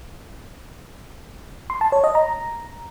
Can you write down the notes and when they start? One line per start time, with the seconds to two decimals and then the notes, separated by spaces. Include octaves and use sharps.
1.70 C6
1.81 A5
1.92 C#5
2.04 D#5
2.15 A#5